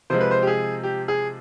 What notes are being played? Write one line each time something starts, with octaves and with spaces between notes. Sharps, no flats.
C3 F3 G#3 C5
B4
C5
G4
G#4
G4
G#4